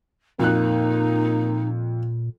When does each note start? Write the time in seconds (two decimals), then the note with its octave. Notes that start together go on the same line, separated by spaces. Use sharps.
0.39 F2 A#2 A#3 D#4 F#6